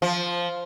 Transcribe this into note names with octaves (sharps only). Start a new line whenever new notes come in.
F3